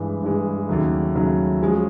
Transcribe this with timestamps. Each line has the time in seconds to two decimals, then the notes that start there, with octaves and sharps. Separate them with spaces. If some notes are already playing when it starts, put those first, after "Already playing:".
Already playing: G2 E3 G#3
0.22 G2 E3 G#3
0.68 D#2 C#3 F#3 A3
1.14 D#2 C#3 F#3 A3
1.60 F3 G#3 C#4 F#4